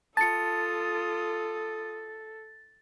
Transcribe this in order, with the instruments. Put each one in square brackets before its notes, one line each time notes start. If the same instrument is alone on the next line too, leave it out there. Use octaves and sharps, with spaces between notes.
[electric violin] F4 D#6 [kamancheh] A4 [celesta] A5 C#7 [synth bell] A6